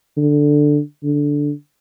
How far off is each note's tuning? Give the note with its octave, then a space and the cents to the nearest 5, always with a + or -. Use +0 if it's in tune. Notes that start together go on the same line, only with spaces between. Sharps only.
D3 +5
D3 -5